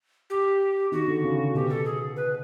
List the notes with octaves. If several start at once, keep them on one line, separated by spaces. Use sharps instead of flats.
G4
D#3 F#4
D3
C#3
B2 G4
A4
G#4
B4